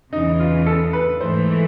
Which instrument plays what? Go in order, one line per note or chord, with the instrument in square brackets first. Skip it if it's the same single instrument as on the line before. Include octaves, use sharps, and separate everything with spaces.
[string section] E2 C#3 E3 [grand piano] D#4
[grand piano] F4
A4
B4
[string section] G#2 E3 A3 [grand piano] C5